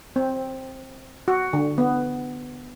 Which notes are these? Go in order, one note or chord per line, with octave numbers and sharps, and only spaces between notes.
C4
F#4
D3
B3